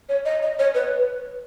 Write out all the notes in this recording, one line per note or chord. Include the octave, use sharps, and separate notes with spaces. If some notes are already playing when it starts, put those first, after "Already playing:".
C#5
D#5
D#5
C#5
B4